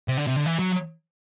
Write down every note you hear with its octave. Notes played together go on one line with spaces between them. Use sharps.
C3
D3
C3
D3
E3
F#3